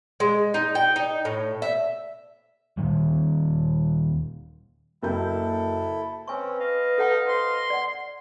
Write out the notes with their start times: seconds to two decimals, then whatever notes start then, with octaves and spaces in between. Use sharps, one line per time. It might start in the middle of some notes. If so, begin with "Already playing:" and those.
0.20 G#3
0.54 D#4
0.75 G5
0.96 D#4
1.25 A2
1.62 E5
2.77 D#1 C#2 D#3 G3
5.03 F#1 A#3 E4 A4 G6
6.28 C4 C#4 B4 G#5 C#6
6.59 D#5 F5
6.98 D#4 A4 F#5 A5
7.28 C5 C6
7.70 D5 F#5